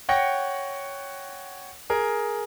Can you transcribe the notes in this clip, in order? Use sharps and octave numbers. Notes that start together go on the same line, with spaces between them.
C#5 F#5 G5 A#6 C#7
G#4 A#4